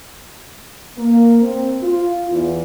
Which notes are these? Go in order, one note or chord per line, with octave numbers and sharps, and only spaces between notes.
A#3
C4
F4
E2